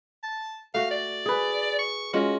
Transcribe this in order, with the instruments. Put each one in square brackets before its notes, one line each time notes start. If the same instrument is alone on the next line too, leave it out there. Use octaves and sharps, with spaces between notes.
[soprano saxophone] A5
[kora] A3 F#4 [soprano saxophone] F5
[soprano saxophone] D5
[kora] G#4 B4
[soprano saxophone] C#6
[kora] G#3 C#4 F4 [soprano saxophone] F#4